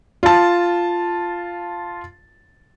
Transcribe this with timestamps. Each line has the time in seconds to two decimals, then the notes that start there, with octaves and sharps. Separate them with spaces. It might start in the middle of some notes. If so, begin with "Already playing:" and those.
0.23 F4 A5